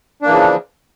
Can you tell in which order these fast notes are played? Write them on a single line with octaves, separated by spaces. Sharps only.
D4 A#3 E3 C#3 F3